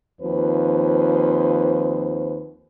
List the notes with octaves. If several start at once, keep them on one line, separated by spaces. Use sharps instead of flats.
D#2 F3 C4 B4 C5